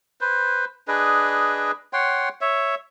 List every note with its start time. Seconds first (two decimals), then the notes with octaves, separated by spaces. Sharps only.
0.21 B4 C5
0.88 D4 G#4 B4 D#5
1.93 C#5 F#5 G5 C6
2.41 C#5 E5